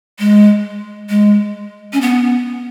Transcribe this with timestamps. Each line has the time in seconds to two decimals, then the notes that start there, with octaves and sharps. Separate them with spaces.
0.19 G#3
1.09 G#3
1.93 C#4
2.01 B3